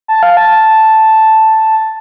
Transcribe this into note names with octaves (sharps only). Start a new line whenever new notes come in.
A5
F5
A5